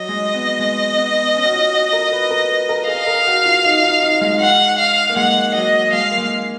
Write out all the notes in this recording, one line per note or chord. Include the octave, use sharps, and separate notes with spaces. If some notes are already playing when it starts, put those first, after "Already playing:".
Already playing: F#3 D#5
G#3
B3
G#3
B3
C#4
F#4
F4
F#4
A#4
B4
A#4
A#4
G#4 F5
A#4
F#4
F4
D#4
D#4
D#4
G#3
F#5
F5
A#3
G#3 F#5
F#3 D#5
G#3 F5
A#3
G#3